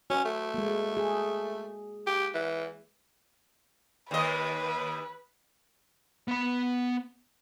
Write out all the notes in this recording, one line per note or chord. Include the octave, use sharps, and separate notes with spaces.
C#4 F#4
A3
G#3 A#3
G#4
G4
E3
D#2 B4 D#5
B3 B5